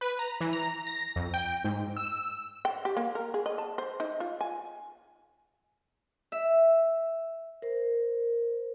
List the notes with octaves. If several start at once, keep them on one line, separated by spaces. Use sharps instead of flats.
B4
A#5
E3
A#5
A#6
F2
G5
G#2
E6
G5
G4
A#3
A#4
G#4
D#5
A5
C5
D#4
F4
G#5
E5
A#4 C5